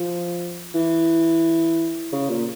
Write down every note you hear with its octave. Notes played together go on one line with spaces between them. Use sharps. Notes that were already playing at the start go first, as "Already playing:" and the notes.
Already playing: F3
E3
C#3
A#2